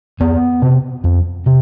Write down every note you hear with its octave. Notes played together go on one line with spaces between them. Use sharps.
F2 B3
C3
F2
C3